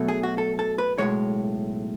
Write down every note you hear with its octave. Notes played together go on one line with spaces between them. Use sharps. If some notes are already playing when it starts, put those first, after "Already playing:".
Already playing: B2 F#3 A3
G#4
F#4
A4
A4
B4
B1 A2 G#3 C#5